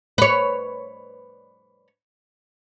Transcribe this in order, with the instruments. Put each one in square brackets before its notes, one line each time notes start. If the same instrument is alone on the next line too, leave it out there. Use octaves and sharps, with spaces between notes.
[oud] B4 C#5